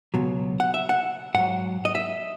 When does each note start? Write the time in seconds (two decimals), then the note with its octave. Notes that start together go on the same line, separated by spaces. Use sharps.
0.14 C#2 B2 F#3
0.60 F#5
0.74 E5
0.89 F#5
1.35 G#2 F#3 F#5
1.85 D#5
1.95 E5